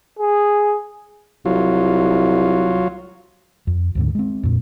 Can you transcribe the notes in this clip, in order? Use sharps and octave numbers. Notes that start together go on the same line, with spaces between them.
G#4
C2 F#3 F4
F2
D2 G#2 D3
G#3 C4
F2 A#2